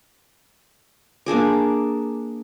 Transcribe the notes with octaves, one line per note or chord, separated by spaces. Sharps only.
A#3 D4 G#4 D5